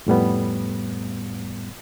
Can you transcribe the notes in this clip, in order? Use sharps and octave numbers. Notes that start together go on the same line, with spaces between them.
F2 A2 G3 B3